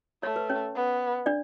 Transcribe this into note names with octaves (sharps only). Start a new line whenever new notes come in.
A3 C#5
B4
C#4 C#5
B3
D4 D5